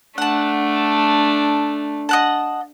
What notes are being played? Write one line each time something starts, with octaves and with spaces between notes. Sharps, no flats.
A3 D4 F#5 A5
D#5 F#5 A5